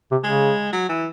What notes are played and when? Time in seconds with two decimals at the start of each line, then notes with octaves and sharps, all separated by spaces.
0.11 C3
0.24 C#3 G#3
0.73 F#3
0.89 E3